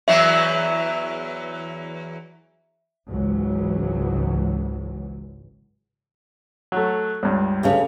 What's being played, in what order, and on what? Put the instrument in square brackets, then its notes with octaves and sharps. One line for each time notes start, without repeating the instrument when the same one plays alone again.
[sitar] E2 E3 F#3 [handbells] E5
[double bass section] G#1 C#2 G#2 E3 F#3
[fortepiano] F#3 A3
C#2 G2
[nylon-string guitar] D2 C#3 C#4 [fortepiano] G4